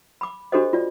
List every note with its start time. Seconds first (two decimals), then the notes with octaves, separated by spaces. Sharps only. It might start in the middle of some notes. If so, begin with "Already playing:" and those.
0.21 B5 D6
0.52 D4 F#4 G4 A4 C5 D#5
0.73 F4 D5